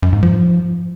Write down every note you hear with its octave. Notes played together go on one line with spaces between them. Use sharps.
F#2
G#2
F3